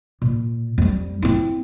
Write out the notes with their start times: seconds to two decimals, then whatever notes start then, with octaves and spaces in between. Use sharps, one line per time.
0.22 A#2
0.78 F2 G3
1.22 C4 E4